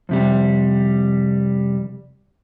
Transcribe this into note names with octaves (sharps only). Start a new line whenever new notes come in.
F2 C3 G3